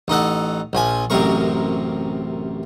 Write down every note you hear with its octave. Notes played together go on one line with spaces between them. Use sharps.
A1 D#4 A4 F#5
A#1 F3 G#5
A1 F#2 C3 A#4 C#6